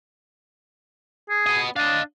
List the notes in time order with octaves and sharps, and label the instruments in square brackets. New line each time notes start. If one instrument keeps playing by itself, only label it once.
[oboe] G#4
[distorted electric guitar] B3 D#5
[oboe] D4 [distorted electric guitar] D#5 F5